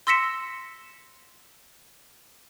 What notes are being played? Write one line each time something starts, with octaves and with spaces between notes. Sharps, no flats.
C6 E6 A#6 B6 C#7 E7